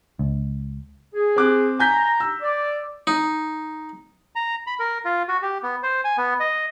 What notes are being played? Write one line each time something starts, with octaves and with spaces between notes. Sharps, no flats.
C#2
G#4
C4 D6 F#6
G#5 A#5 G6 B6
E6
D5
D#4
A#5
B5
A#4
F4
F#4
G4
B3
C5
G#5
B3
D#5